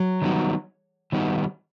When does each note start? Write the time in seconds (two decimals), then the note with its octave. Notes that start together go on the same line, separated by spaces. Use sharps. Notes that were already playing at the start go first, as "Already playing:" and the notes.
Already playing: F#3
0.22 D#3 G3 B3 D#4 F#4
1.12 D#3 G3 B3 D#4 F#4